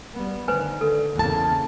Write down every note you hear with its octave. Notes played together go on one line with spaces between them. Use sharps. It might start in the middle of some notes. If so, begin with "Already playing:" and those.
G3 B3
D3 D#3 B4 C5 G#5
D3 A4
E2 C#3 A#3 A5